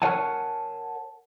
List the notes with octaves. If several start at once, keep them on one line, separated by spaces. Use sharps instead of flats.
A#4 B4 C#5 F#5 G#5 A5